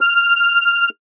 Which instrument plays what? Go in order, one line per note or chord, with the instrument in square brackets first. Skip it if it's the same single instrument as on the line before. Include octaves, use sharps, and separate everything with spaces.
[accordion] F6